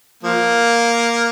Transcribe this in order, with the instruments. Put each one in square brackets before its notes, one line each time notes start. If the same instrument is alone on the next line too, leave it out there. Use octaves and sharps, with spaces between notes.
[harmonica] F3 A#3